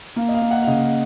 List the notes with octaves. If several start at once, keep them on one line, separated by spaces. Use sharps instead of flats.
A#3 F5
D#5
F5
A#3
F#5
F5
C#3 D#5